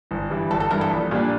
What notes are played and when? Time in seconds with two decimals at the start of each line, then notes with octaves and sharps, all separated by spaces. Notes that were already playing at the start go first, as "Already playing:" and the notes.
0.11 G1
0.30 G2 E3 G3
0.50 G1 A4
0.60 A4
0.71 G2 E3 G3 A#4
0.81 A4
0.91 A#1
1.11 A#2 G3 D4